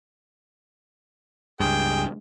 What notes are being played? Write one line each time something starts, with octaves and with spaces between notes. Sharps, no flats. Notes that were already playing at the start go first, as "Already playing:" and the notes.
C#2 G2 G#4 G5